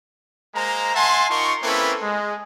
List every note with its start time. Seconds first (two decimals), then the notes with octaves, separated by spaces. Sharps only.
0.55 G#3 A#3 C5 A#5
0.95 E5 F#5 G#5 A5 C6
1.30 D#4 F4 A#4 C6 C#6
1.63 A#3 C4 C#4 E4 A4 B4
2.02 G#3